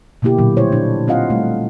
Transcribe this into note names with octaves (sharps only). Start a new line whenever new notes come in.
B2 D3 A#3 E4 G4
A#2 D3 F#3
D3 F3 A3 E4 C5 C#5
D4 E4
C4 F4 D#5 F5 F#5
G3 A3